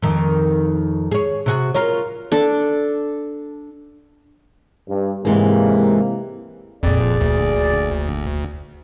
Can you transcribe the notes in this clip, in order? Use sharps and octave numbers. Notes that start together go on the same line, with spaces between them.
F2 D#3
G#4 C#5
C3 F#4 G#4
F4 A#4 C#5
D4 A4
G2
G#2 C3 E3 G#3 A#3
F1 F2 A#2 G#4 D5
D2